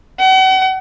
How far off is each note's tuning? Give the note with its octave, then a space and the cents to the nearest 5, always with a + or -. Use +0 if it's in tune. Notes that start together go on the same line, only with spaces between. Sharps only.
F#5 +40